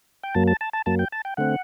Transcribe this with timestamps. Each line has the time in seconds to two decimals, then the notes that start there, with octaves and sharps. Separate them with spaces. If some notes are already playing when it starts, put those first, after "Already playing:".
0.23 G5
0.35 F#2 F#3 A#3 A5
0.47 A5
0.61 A5
0.73 A5
0.86 F#2 F#3 A#3 A5
0.99 G5
1.12 A5
1.25 G5
1.37 D3 A3 C4 F#5